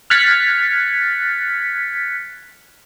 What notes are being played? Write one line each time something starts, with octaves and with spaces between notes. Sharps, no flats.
F6 F#6 G#6 A6 B6 C#7